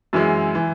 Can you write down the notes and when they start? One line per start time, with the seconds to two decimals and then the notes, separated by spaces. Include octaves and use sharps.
0.13 F#2 E3 G#3
0.55 E3